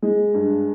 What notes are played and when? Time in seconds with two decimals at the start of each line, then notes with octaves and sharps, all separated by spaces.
0.02 G#3
0.34 G2